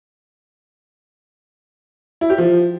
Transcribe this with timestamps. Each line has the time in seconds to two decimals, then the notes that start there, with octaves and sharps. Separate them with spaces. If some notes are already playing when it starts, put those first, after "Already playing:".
2.21 E4
2.30 G4
2.38 F3